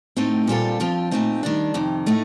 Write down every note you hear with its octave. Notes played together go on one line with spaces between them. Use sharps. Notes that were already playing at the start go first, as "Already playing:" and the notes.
A2 A3 C4 D#4
A#2 G3 C4 F4 A4
G2 F3 C4 F4
A#2 A3 C4 D#4
D#3 G3 D4
F2 C3 D#3
A2 A3 D#4